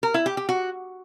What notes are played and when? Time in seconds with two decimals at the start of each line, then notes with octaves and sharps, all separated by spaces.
0.03 A#4
0.14 E4
0.26 G4
0.37 G4
0.49 F#4